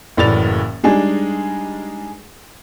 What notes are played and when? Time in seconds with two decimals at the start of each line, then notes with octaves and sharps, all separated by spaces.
0.17 F#1 A2 E3 D5 A6 F7
0.84 G3 G#3 D4 D#4 G#4